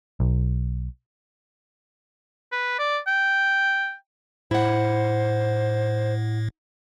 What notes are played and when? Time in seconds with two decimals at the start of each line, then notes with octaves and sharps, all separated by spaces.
0.20 B1
2.52 B4
2.79 D5
3.07 G5
4.51 A2 E4 C5 F#5